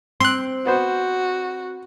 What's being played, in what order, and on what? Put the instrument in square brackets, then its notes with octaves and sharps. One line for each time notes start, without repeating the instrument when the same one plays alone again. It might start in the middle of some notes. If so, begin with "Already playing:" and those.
[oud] C4 [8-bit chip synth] C6 F#6
[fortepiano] B3 C5 [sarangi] F#4